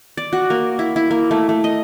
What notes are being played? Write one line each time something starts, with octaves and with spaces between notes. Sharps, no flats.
D5
F#4
A#3
E4
E4
A#3
A3
A3
D#5